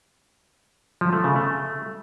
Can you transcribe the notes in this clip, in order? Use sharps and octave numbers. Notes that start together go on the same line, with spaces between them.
F3
A3
C#3
A3